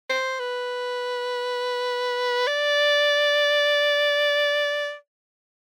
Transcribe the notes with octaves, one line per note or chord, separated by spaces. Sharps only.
C5
B4
D5